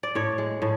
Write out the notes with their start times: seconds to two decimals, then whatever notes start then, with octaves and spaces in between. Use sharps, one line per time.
0.03 D5
0.15 A2 C#5
0.38 G#3
0.62 A2